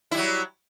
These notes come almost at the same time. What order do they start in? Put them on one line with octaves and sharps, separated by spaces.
E4 G3 F#3